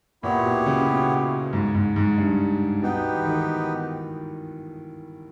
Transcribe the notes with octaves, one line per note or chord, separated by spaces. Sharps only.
A#2 B3 E4 G4 C#5
B2
C#3
B2
G#2
G#2
G#2
G2
B2 B3 D#4 G4 B4 G5
E3
D#3